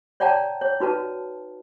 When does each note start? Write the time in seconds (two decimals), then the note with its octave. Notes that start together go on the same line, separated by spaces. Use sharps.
0.20 C#5 D5 F#5 G5 A5 A#5
0.61 C#5
0.80 D#4 F#4 B4 A5